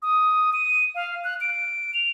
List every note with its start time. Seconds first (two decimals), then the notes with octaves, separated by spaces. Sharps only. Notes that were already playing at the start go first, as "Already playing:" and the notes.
0.02 D#6
0.53 D#7
0.95 F5
1.24 F#6
1.41 D7
1.94 F7